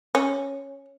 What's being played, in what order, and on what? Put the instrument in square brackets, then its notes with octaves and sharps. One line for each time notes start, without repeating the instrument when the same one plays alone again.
[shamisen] C#4